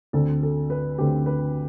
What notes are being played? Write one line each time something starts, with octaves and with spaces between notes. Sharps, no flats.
D2 D3 A3 C4 A4
A4
B4
D2 D3 A3 C4 G4
B4